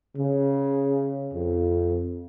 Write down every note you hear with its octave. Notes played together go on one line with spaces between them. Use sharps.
C#3
F2